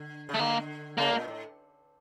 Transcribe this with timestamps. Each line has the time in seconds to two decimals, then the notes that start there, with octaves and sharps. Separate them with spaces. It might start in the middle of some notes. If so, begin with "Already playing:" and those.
Already playing: D3
0.29 C#3
0.34 A3
0.39 D3 A#3
0.98 C#3 A#3
1.12 A#2
1.28 A2